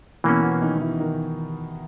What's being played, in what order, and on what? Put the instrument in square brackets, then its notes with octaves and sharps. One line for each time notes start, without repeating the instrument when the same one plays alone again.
[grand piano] B2 B3 [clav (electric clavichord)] E3 A#3 C#4
[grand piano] B2 B3
D#3 D#4
E3 E4
D#3 D#4